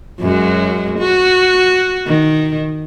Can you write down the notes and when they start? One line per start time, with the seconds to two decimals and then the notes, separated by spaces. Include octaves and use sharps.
0.20 F#2 F#3 G#3
0.99 F#4
2.07 D#3